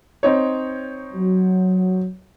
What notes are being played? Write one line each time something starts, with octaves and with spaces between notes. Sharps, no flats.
C4 D#4 C#5
F#3